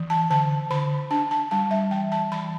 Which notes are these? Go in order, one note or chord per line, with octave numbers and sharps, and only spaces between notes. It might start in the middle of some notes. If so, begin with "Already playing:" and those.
Already playing: E3
A5
D3 A5
D3 B5
D4 A5
A5
G3 A5
E5
E3 G5
A5
E3 B5